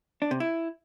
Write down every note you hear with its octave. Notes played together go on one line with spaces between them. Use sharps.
D4
C3
E4